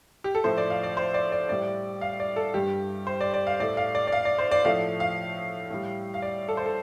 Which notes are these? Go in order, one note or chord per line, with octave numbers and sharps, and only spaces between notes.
G4
A4
A2 F3 A3 C5
D5
F5
D5
C5
D5
D5
A2 G3 D5
F5
D5
A4
G2 G3 G4
C5
D5
D5
F5
A2 A3 D5
F5
D5
D5
F5
D5
C5
D5
A2 F3 A3 F5
F5
A2 G3
F5
D5
A4
C5
A4